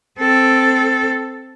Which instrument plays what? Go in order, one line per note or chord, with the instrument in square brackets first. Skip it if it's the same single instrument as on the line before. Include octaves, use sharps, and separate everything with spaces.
[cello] C4 A4